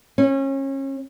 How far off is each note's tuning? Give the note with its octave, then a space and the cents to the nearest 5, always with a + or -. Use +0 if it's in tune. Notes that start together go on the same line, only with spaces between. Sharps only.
C#4 -30